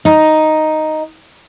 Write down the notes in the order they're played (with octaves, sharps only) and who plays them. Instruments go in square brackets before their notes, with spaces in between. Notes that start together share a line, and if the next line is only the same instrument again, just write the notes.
[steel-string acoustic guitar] D#4